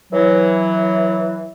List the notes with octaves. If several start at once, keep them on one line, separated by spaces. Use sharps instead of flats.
E3 F#3